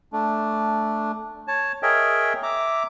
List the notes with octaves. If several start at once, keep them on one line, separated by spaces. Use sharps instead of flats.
A3 D4
C#5 A5
G#4 A#4 C#5 D#5 E5 G5
E5 A#5 D6